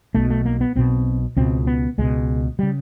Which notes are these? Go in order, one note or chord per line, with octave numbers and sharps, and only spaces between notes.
B1 B2 A3
A3
A#3
B3
B1 B2 C4
C#2 B2 C4
B3
C#2 B2 G#3
C#3 G3